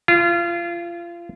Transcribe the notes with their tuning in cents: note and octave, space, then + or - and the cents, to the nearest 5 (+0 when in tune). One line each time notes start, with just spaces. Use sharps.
F4 -30